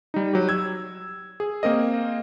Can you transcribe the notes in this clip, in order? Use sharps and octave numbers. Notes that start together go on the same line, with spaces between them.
G3 D#4
F#3 G4
E6 G#6
G#4
A#3 C4 A#4 D#5